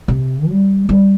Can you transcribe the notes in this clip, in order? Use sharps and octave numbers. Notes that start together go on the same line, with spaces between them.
C3
G3
G3